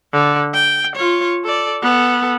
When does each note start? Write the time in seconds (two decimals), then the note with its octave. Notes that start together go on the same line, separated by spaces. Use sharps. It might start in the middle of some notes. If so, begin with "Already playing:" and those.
0.13 D3
0.54 G5
0.96 F4 C#5
1.44 A4 D5
1.82 B3 A4